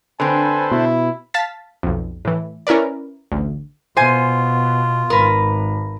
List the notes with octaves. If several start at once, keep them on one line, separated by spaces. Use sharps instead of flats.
D3 C4 A4 B4 C5 G#5
B2 E4
F5 A5 A6 B6
B1 F2
A2 E3
C#4 E4 A#4 B4 D5
A1 D2
B2 B3 F4 C5 G#5
G#1 A#4 B4